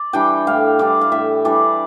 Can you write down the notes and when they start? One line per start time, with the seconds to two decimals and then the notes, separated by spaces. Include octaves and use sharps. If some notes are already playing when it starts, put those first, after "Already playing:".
Already playing: D5
0.13 E3 G3 D4 G5
0.47 A2 F5
0.79 E3 G3 D4 D5
1.01 F5
1.12 A2 E5
1.45 E3 G3 D4 D5